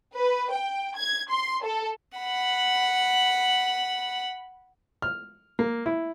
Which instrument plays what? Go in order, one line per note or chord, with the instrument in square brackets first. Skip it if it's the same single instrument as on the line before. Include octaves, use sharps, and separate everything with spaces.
[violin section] B4
G5
G#6
C6
A4
[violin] F#5 B5
[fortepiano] F6
A#3
E4